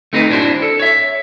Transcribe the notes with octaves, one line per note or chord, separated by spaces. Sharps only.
A3 C4 D#4 G#4 B4
D4 E4 F#4 C5
A4
C#5 E5